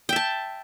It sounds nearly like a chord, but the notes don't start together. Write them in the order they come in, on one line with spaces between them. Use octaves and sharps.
G5 E5 A5